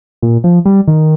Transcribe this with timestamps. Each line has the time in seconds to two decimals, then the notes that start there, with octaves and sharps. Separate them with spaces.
0.22 A#2
0.44 F3
0.66 G3
0.88 D#3